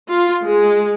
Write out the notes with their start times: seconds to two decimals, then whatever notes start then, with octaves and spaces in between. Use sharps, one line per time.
0.10 F4
0.44 G#3